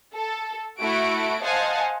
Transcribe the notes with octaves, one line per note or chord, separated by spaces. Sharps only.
A4
A3 E4 F#4 D7
C5 D#5 F5 F#5 G#5 A5